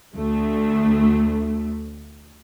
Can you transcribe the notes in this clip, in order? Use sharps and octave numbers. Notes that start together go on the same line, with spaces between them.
D2 A3